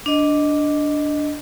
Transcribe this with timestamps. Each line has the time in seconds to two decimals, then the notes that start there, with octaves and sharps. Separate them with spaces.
0.06 D4 D#5